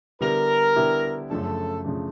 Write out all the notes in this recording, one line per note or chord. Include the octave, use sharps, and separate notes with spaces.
D3 G3 B3 E4 G4 A#4
D3 G3 B3 E4 G4
F#2 C#3 F3 A3 D4 A4
C#3 F3 A3 D4